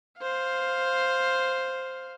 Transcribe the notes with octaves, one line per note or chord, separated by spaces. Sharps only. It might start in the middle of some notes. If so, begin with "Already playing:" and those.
C5 F5